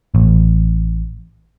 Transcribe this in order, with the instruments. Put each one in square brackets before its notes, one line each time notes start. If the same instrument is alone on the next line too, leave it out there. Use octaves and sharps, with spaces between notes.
[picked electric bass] A1